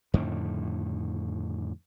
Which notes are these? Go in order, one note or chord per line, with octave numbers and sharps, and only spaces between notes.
F2 A2 D3 D#3